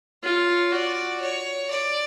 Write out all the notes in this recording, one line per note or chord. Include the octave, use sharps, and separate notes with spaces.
F4 C#5
F#4 D5
C#5
D5